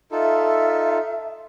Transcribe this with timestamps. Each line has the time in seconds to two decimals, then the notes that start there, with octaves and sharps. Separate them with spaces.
0.11 D#4 F4 A4 E5